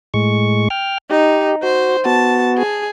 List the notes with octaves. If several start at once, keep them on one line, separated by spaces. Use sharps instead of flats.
A2 G#3 C#6
G5 F6
D#4 G4
F#4 C5
B3 F#4 A5
G#4